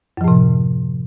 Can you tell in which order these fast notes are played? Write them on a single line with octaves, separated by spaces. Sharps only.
F#2 F3 A2 C3